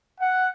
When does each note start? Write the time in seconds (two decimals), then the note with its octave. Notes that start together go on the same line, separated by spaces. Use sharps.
0.19 F#5